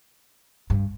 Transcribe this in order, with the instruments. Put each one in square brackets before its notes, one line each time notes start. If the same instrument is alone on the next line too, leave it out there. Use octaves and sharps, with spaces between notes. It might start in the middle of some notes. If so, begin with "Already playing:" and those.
[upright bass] G2